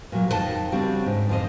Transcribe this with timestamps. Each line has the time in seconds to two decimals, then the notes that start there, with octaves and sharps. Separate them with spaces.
0.12 A#2 F#3
0.28 F2 D#3 C#4 A4 D#5 A5
0.72 C#3 G3 C4 D4 F#4
1.06 G#2
1.29 F2 D3 C5 D#5